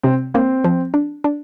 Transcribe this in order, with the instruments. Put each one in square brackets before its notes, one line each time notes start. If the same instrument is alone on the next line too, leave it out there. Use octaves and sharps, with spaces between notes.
[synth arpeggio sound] C3 [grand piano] C4
[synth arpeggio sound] A#3 [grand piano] C4
[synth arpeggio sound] F3
D4
D4